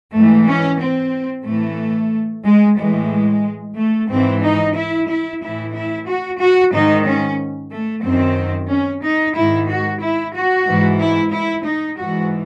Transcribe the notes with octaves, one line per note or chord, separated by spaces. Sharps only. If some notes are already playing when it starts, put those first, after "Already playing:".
G#2 E3 A3
C#4
C4
A2 E3 A3
G#3
A2 E3 G#3
A3
G#2 E3 C4
D#4
E4
E4
A2 E3 E4
E4
F#4
F#4
G#2 D#3 D#4
C#4
A3
F#2 D#3 C4
C#4
D#4
G#2 D#3 E4
F#4
E4
F#4
G#2 E3
E4
E4
D#4
G#2 E3 F#4